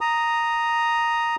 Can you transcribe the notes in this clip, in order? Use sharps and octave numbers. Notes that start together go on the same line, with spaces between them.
A#5 D#6